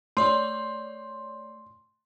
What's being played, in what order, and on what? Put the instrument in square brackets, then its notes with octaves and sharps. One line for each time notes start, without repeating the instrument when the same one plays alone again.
[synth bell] A3 C#5 D5 [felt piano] C6